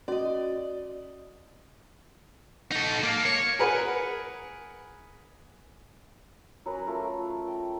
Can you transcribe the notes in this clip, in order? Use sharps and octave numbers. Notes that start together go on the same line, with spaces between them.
C#4 F#4 D5 D#5
D#4 A4
A#3
C#5
G#4 A#4 B4 F#5
F#3 C#4 A#4 B4
A3 F4 A#4
G5